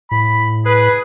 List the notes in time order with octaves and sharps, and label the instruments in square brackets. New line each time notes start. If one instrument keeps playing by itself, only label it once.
[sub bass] A2 [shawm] B5
[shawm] G#4 [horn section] B4